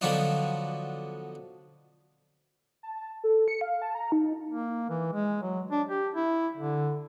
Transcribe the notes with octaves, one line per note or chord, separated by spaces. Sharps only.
D3 F3 F#3 B3 D4 D#4
A5
A4
C#7
F5
A5
A#5
D#4
A#3
E3
G#3
F#3
D4
G4
E4
D3